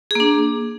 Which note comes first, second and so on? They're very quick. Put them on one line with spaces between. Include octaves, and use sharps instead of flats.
G#4 A#3 D4